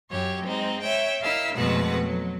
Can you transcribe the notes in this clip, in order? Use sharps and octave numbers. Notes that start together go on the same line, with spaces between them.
F#2 G4 C#5
G#3 C4 D#4
C#5 E5 G5
E4 A#4 D#5 F5 E6
F2 B2 G#3 A3 B4 F#5
F#3